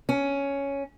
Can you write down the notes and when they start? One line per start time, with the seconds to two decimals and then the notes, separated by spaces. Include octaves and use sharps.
0.09 C#4